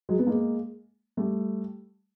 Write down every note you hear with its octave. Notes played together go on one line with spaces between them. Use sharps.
F#3 G#3
B3
G#3 A#3
G3 A3